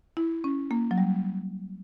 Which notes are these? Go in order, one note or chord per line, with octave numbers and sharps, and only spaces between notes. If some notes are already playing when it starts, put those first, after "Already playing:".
E4
C#4
A#3
F#3
G3